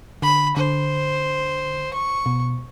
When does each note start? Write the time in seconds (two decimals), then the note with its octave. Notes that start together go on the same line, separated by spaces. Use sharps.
0.22 D3 B5
0.57 D3 C5
1.94 C#6
2.26 B2